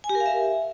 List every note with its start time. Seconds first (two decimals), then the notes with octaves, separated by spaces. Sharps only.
0.04 G#5
0.09 G4
0.15 A#4
0.20 F5
0.26 E5